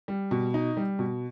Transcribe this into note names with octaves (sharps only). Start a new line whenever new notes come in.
G3
B2
D#4
G3
B2